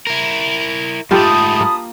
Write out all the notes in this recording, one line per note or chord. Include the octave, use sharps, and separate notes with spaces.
E4 A#4
G#2 A3 F4 G4 A4 A5 B5 D#6
A#3